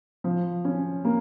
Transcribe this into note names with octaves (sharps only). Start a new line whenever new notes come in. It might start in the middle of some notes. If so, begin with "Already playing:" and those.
F3
C#4
A#3